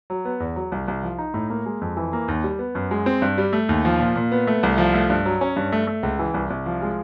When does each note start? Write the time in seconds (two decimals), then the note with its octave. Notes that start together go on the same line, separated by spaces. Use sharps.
0.10 F#3
0.25 B3
0.40 E2
0.56 F#3
0.72 C2
0.88 C2
1.03 F3
1.18 D#4
1.34 A2
1.50 A#3
1.66 G#3
1.81 F2
1.97 E3
2.13 A#3
2.28 D#2
2.44 G3
2.59 B3
2.75 F#2
2.91 G#3
3.06 C4
3.22 G2
3.38 G3
3.53 A3
3.69 D#2
3.85 F3
4.00 A#2
4.16 A#2
4.32 B3
4.47 A3
4.63 C2
4.78 F3
4.94 A3
5.10 G2
5.25 F#3
5.41 C#4
5.56 G2
5.72 A3
5.87 A3
6.03 C#2
6.19 E3
6.34 C2
6.50 C2
6.66 F3
6.82 G#3